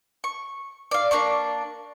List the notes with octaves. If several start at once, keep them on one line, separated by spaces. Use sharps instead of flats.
C#6
D5 F5
A#3 D4 D5 C#6